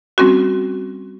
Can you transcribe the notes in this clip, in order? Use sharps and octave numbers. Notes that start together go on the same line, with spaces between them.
G3 C4 C#4 F#4